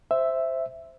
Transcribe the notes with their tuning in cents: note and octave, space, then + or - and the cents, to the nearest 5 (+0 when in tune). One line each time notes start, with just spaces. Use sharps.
C5 +0 E5 +0